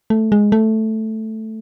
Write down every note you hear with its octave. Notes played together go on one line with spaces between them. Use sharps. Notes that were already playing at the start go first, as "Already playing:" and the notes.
A3
G#3
A3